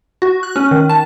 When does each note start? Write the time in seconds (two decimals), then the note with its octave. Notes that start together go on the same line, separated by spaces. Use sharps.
0.22 F#4
0.43 F#6
0.56 C#4
0.71 D#3
0.89 A5